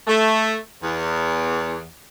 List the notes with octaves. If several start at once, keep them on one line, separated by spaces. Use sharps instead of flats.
A3
E2